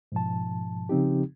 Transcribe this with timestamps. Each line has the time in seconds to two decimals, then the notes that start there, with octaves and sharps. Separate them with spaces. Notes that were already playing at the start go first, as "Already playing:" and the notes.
0.12 G#2 B2 F3 A5
0.89 C#3 F3 C4 D#4 G4